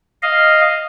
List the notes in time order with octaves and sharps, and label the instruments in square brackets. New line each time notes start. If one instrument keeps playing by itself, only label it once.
[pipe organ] D#5 F5